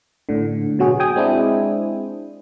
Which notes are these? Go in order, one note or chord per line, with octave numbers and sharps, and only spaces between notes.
A2 D3
B2 F#3 F#4 G#4
G5 G#5 D#6
G#3 C4 D4 E4